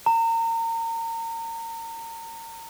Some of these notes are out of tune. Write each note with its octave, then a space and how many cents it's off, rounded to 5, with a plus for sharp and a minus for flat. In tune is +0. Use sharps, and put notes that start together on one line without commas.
A#5 -30